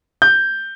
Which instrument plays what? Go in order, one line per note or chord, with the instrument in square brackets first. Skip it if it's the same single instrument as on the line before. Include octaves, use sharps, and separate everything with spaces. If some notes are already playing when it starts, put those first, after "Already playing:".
[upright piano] G6